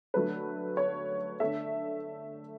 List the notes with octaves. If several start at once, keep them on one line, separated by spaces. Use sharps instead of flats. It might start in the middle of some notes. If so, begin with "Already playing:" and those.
D3 F#3 A3 B4
C#5
D3 A3 E5